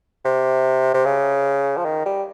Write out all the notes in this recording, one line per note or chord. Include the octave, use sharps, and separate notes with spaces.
C3
C3
C#3
F3
D#3
G3